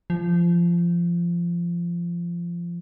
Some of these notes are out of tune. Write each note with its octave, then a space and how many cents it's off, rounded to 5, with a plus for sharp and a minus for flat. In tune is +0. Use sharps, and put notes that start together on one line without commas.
F3 -20